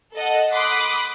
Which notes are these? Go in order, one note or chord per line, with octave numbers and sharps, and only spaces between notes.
A4 D#5 F#5 A5
B5 C6 D6 D#6 F#6 B6